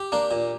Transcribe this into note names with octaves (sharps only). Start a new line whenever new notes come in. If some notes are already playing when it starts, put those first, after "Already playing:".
Already playing: G4
A#3 D4
A#2